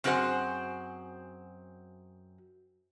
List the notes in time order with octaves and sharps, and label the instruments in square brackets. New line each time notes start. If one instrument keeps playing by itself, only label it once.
[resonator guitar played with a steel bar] F#2 C4 F#4 G#4 C5 F#5